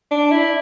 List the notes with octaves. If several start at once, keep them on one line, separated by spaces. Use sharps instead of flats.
D4
E4